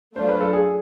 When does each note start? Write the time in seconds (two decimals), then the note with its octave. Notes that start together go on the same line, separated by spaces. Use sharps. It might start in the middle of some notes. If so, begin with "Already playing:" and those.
0.16 F#3 A3 D4 F4 C5
0.29 B4
0.41 A4
0.53 G#4